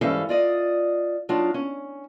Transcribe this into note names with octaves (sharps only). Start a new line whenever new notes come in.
G#2 E3 G3 C#4 A4 F5
F4 D5 D#5
F#3 D4 D#4 F4
C#4